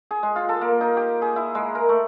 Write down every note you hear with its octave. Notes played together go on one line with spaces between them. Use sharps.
G#4
G#3
F4
A4
A#3
D#4
G4
G#4
E4
G#3
A#4
A3